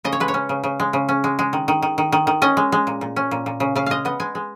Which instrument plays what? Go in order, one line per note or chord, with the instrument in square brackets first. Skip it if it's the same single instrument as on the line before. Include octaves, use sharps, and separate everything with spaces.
[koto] C#3 D#5
C#5
G#3 B4
C#5
C#4
C#3
C#3
G#3
C#3
C#4
G#3
G#3
D#3
D#3
D#3
D#3
D#3
D#3
C#4 D#5
G#3
G#3
A#2
A#2
C#4
A#2
A#2
C#3
C#3 F5
G#3 D#5 F5
B3 D#5
G#3 G#5
G#3